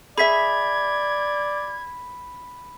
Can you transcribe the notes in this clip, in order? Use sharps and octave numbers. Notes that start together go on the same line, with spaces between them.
G#4 D5 E5 B5 G#6 B6